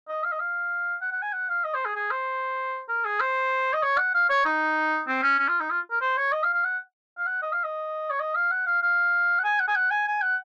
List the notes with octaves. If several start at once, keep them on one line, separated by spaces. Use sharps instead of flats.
D#5
F5
D#5
F5
F#5
F#5
G#5
F#5
F5
D#5
C5
G#4
G#4
C5
A#4
G#4
C5
D#5
C#5
F#5
F5
C#5
D#4
C4
C#4
C#4
F4
D#4
F4
A#4
C5
C#5
D#5
F5
F5
F#5
F5
F#5
D#5
F5
D#5
C#5
D#5
F5
F#5
F5
F5
F#5
G#5
F#5
G#5
F#5
G#5
G#5
F#5